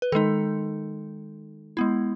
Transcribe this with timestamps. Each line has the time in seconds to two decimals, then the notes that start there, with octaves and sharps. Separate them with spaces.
0.02 B4
0.12 D#3 G#3 D#4 A4
1.77 G#3 B3 E4